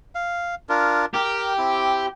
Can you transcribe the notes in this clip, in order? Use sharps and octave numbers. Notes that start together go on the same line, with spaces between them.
F5
D4 F4 A#4
G4 A#4
C4 E4